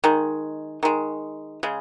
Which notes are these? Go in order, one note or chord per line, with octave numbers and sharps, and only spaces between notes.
D#3 G#3
D#3 G#3
C#3 G#3